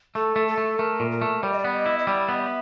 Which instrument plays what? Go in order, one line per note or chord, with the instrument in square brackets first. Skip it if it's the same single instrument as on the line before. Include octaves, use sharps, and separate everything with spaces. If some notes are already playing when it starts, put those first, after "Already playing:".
[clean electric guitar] A3 [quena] A4
[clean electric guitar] A3
[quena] A4
[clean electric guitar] A3
[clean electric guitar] A3 [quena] A#4
[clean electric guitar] A#2
[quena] A#4
[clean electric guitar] A3
[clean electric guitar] G3 [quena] D5
[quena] D#5
D5
[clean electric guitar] B3
[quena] D#5
[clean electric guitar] E4
[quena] D#5
[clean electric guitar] G3 [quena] D5
[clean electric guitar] B3
[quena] D#5
E5